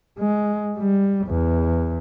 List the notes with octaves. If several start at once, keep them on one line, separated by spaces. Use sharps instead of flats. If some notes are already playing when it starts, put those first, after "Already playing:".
G#3
G3
E2